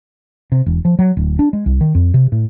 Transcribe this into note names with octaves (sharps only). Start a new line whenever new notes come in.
C3
E1
F3
F#3
D1
D4
G#3
C2
D#3
F2
C3
A2